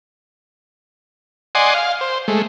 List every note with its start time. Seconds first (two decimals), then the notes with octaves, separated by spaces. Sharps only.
1.55 D5 D#5 F#5 G#5 C6
1.74 F5
2.01 C5
2.28 G#3 A3